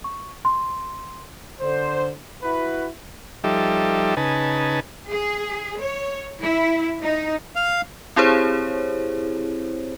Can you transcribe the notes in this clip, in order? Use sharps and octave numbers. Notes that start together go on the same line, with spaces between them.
C#6
C6
D3 C5
E4 F#4 B4
F3 G3 D#4 G4 A4 E5
C#3 D#4 B4 G#5 A5
G#4
C#5
E4
D#4
F5
C4 E4 G4 G#4 C5 C#5